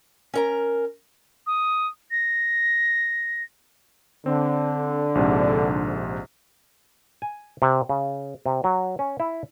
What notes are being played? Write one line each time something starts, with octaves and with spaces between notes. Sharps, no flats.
C#4 A#4 A#5
D#6
A#6
D3 C4
A#1 G#2 C3
G#5
C3
C#3
C3
F#3
C#4
E4